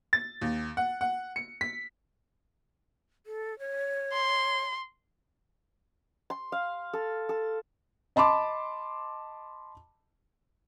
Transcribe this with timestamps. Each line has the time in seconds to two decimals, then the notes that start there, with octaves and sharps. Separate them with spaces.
0.13 A6
0.41 D#2
0.77 F#5
1.01 F#5
1.36 C#7
1.61 B6
3.26 A4
3.59 C#5
4.13 C6
6.30 C6
6.52 F5
6.93 A4
7.29 A4
8.16 D#5 A5 B5 C6 D6